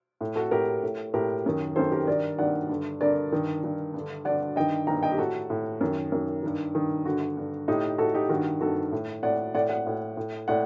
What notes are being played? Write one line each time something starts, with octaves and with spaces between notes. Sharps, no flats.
A2
F#4 A4
A2 G4 A#4
A2
A2 G4 A#4
F#2 D#3
F#2 D#3 A4 C5
G4 A#4
G2 D#3 A#4 D5
G2 D#3 D5 F#5
G2 D3
G2 D3 A#4 D5
G2 D#3
G2 D#3
G2
D3
G2 D3 D5 F#5
G2 D#3 D#5 G5
G2 D#3 G5 A#5
D#5 G5
G4
A2 F#4 A4
A2
F#2 D#3
F#2 D#3
G2 D#3
G2 D#3
G2 D3 F#4
G2 D3
A2 D#4 G4
A2 F#4 A4
D#4 G4
G2 D#3 F#4
G2 D#3 F#4 A4
A2
A2 D5 F#5
A2 D5 F#5
D5 F#5
A2
A2
A2 D5 F#5